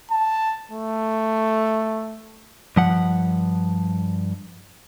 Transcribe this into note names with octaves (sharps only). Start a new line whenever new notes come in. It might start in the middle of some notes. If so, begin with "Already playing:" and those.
A5
A3
G2 F3 F#5